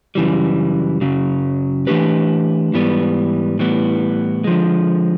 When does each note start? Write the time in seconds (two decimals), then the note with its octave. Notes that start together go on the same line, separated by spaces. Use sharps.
0.15 F#2 C#3 E3 G3
1.01 F#2 C#3 F#3
1.87 E3 A3 D4 G4 B4
2.73 G#2 E3 G3 B3
3.59 A2 E3 G3 B3
4.44 D3 F3 G#3